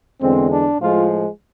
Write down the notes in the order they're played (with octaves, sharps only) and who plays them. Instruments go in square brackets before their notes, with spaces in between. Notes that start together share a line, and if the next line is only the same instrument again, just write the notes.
[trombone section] E2 D3 G#3 C4
D4
A2 F3 G#3 F4